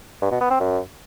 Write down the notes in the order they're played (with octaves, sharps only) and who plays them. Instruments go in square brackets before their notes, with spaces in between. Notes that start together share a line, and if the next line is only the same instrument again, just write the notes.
[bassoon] G2
B2
B3
C4
F#2